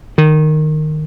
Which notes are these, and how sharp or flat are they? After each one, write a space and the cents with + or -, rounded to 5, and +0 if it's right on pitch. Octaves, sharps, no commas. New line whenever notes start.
D#3 -15